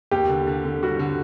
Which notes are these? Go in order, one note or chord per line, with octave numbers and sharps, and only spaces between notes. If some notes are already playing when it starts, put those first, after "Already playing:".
D#2 G4
D3
D3
D3
G3 F#4
D3